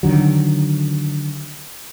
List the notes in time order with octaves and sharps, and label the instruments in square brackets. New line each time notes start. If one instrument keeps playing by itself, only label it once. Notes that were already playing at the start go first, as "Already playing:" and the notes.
[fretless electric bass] D3 D#3 F#3